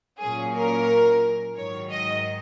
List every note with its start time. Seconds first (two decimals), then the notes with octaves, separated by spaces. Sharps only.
0.20 A#2 F#3 A#3 C#4 G#4
0.54 A#4
1.56 G#2 D#3 F#3 C#5
1.90 D#5